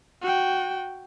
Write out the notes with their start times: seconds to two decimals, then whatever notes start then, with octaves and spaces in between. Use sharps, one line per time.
0.22 F#4 G5